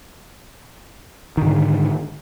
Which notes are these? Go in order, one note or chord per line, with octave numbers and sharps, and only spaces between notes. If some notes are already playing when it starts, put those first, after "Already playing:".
G#2 D3 D#3